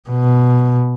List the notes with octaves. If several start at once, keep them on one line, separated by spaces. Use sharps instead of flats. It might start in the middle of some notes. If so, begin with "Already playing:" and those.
B2